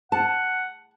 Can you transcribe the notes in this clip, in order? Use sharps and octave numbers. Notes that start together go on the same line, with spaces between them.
F#5 A5